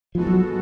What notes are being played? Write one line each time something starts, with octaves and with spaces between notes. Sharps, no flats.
G#2 F3 G#3 B3 F#4 A4
F#3